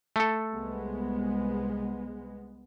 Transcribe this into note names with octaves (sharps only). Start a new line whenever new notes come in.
A3 A4
C2 G#3 B3